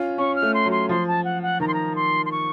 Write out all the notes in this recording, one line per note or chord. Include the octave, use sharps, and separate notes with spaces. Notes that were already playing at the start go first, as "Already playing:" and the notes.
Already playing: C#4 F4
C#4 C#6
F6
A3
C6
F#3
C6
F3 C6
A5
F#5
F#5
D#3 A#5
C6
A#5
C6
C6
C#6